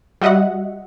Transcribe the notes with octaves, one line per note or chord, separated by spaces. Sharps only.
G3 F#4 D#5 E5 F#5